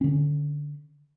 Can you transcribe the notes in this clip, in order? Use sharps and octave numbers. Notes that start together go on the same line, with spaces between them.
D3 C#4